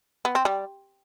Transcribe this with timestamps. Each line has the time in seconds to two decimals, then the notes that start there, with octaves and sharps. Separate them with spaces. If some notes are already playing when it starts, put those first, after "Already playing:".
0.25 B3
0.35 C4
0.45 G3